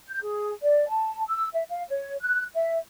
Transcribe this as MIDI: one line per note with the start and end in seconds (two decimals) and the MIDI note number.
0.09 0.20 91
0.22 0.51 68
0.62 0.86 74
0.89 1.23 81
1.28 1.48 88
1.53 1.63 76
1.70 1.84 77
1.90 2.16 73
2.21 2.45 90
2.54 2.77 76